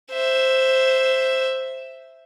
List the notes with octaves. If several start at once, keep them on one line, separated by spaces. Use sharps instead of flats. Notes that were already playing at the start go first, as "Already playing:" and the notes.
C5 E5